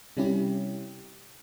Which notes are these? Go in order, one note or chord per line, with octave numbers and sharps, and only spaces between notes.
C3 G3 C#4 E4 G4